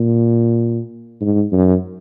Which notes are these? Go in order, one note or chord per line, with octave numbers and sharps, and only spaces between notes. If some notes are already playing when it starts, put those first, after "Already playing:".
Already playing: A#2
G#2
F#2